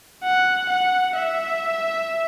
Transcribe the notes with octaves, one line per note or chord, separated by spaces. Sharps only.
F#5
F#5
E5